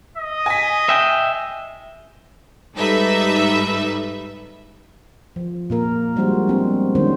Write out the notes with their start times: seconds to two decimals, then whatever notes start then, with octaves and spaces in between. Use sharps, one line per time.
0.17 D#5
0.46 G#5 B6
0.89 E5 G5
2.76 G#2 G3 D#4 A4 B4 E5
5.36 F3
5.70 A#2 A#3 A#4
6.16 F3 G3 G#3 D4 F#4 C5
6.47 B3 C4 D4
6.95 D#3 G#3 C#4 D4 C5